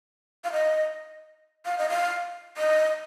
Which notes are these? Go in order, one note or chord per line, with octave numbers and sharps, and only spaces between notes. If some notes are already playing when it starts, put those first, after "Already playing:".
F5
D#5
F5
D#5
F5
D#5